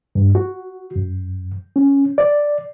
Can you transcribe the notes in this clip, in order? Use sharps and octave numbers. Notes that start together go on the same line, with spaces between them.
G2
F#4
F#2
C#4
D5